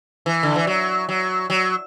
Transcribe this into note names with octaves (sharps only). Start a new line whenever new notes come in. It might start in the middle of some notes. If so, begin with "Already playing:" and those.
E3
D3
E3
F#3
F#3
F#3